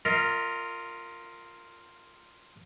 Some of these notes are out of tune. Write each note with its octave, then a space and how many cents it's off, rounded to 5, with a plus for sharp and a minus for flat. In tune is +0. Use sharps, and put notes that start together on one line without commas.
F4 +0 A#4 -20 D#5 +40